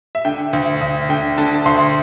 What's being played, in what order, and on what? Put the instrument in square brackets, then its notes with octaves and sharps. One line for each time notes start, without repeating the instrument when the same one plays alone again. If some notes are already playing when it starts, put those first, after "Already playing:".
[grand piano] E5
D3 G5
D2
D2
D3 G5
D3 A5
A5
D2 C6